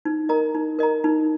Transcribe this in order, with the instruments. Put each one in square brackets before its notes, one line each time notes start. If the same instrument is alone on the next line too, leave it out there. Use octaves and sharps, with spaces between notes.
[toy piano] D#4
A#4 D#5 A#5
D#4
A#4 D#5 A#5
D#4